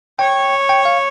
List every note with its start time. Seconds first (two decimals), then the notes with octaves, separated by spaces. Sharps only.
0.19 C#5 G5
0.69 G5
0.85 F5